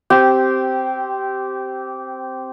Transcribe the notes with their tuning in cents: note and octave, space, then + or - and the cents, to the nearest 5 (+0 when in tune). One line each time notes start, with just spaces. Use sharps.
C4 +0 G4 -15